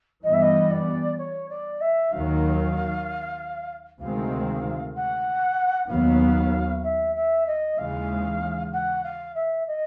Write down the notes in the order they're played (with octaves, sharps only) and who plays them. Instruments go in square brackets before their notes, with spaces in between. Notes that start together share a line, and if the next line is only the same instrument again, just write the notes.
[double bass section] G2 E3 G3 B3 [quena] D#5
[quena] E5
D#5
D5
C#5
D5
E5
[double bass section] D#2 D#3 F#3 [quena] F5
[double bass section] D2 C3 D#3 G#3 C4 [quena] F5
[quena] F#5
[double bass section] D#2 D#3 F#3 B3 [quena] F5
[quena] E5
E5
D#5
[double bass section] D#2 C#3 E3 G#3 [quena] F5
[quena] F#5
F5
E5
D#5